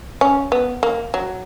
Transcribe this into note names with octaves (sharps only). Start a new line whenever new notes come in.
C#4
B3
A#3
F#3